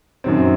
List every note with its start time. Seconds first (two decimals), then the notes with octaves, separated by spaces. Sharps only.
0.24 F#2 D#3 F#3 C4